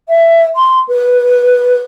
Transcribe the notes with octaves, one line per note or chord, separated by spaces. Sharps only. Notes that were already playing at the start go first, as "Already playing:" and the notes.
E5
C6
B4